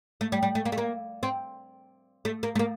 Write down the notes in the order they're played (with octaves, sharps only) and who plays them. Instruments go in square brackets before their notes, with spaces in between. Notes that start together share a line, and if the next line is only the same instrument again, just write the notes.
[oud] A3
G3
G3
A3
A#3
A3
A#3
C4
A3
A#3
A3
A#3